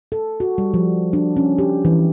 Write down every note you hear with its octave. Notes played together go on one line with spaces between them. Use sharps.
A4
F#4
G3
F3
D4
C#4
G4
E3